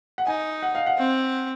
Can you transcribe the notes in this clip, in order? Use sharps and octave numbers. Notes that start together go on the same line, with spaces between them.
F#5
D#4 G#5
F#5
F5
F#5
C4